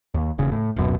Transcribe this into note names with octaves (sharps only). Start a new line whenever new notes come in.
D#2
E1 C#3
A2
D1 F#2 B2